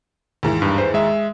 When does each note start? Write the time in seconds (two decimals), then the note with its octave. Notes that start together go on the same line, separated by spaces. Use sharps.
0.43 D#2 G#2 E3
0.62 G2
0.78 B4 C5
0.94 G#3 E5